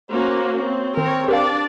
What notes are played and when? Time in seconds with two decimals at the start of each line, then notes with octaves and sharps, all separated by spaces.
0.10 A#3 C#4 F#4 C5
0.58 C4 C#5
0.97 D#3 C4 A#4 C#5
1.28 D4 G4 A#4 D5 F5